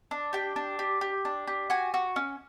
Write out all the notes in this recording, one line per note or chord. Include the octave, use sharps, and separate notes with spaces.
D4
G4 G5
D4
G4
G4
D4
G4
F#4 G#5
F#4
C#4